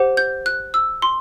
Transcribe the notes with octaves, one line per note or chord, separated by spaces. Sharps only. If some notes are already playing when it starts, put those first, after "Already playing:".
Already playing: G4 C5 F#5
G6
F#6
E6
C6